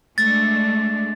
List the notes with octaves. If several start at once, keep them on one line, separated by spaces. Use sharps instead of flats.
G#3 A3 D4 A6